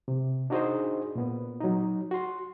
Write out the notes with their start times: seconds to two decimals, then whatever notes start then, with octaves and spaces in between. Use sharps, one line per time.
0.08 C3
0.50 D4 D#4 F#4 G#4 C5 D#5
1.15 A#2 B3
1.60 F#3 D#4
2.11 F#4 C6